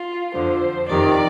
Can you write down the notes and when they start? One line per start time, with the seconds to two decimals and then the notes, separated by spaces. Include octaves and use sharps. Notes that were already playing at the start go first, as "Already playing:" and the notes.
Already playing: F4
0.34 F2 D3 F3 C5
0.89 F2 C3 D#3 D5